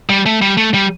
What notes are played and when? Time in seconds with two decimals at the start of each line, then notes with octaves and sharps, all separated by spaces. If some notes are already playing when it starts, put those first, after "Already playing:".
0.10 G3
0.26 A3
0.42 G3
0.57 A3
0.74 G3